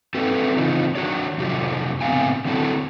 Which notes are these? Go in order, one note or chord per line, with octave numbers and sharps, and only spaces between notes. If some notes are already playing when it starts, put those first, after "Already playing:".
C4 F#4 G4 A4 B4
C#3 E3 C4 D#4 F4
D#3 D4 F#4 C#5 D5
F2 C3 F#3 G4
A2 C#3 B3 C4 F5 G#5
D3 F#3 C4 E4 F#4 A4